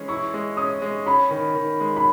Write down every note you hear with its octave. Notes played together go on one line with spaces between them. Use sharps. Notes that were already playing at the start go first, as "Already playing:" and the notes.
Already playing: E3 G#3 C#4
E4 C#6
G#3
C#4 D#6
G#3
C#4 B5
D#3
D#3
G#3
B5